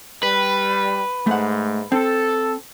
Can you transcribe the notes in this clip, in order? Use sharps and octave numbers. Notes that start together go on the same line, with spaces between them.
G3 B4
G#2 A3 F#5
C4 A4